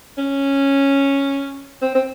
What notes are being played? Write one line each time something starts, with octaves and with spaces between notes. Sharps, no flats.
C#4
C4
C4